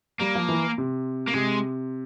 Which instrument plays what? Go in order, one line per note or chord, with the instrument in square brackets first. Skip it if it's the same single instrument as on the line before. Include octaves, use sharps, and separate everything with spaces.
[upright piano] G3 [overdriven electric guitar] A#3
[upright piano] F3
E3
C3
[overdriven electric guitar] A#3
[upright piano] C3 [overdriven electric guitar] G#3